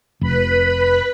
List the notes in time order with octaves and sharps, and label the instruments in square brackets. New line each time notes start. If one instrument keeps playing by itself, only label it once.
[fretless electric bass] F1 [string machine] B4 B5